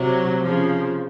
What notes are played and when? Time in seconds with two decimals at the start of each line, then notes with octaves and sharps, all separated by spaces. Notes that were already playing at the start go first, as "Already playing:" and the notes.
Already playing: C3 F#3
0.44 C#3 F3